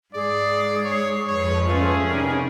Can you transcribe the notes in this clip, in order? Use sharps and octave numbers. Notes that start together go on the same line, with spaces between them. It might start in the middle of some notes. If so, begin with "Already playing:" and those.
G#2 G#4 D5
C#5
F2 F3 B4 C#5
A3 C#4 F4 G#4
C3 G3 D#4 A#4